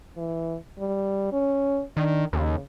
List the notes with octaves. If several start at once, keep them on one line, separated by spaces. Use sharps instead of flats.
E3
G3
C#4
D#3 D4
D#2 C#3